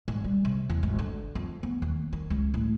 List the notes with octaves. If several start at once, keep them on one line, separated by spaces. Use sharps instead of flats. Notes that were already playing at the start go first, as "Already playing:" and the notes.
G#2
G3
C3
E2
G#1
D3
F2
B3
D#2
D#3
C#2
A2